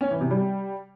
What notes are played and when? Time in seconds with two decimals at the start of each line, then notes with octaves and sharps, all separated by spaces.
0.01 C#4
0.11 E3
0.21 C3
0.31 G3